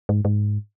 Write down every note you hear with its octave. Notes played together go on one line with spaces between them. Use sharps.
G#2
G#2